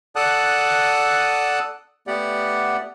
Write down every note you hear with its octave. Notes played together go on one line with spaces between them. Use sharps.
A4 D5 F#5 A5 D#6 F#6
A3 B3 G4 D5 F#5